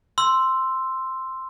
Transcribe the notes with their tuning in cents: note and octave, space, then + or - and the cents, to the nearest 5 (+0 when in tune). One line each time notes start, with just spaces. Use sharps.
C6 +0 E6 +5